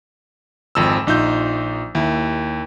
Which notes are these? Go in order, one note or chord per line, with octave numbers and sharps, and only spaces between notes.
G#1 F2 E6
A#1 D#4 F4 G6
D#2 E4